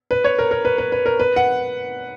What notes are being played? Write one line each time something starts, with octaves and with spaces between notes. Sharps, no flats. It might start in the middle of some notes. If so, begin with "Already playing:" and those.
B4
C#5
A#4
A#4
B4
B4
B4
A#4
B4
F#5